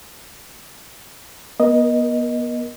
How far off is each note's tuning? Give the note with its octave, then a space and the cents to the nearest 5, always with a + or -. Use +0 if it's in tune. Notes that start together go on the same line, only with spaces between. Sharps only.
B3 -30 A#4 +30 D#5 +0